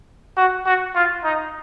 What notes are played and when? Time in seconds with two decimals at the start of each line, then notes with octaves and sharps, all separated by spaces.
0.37 F#4
0.66 F#4
0.95 F4
1.24 D#4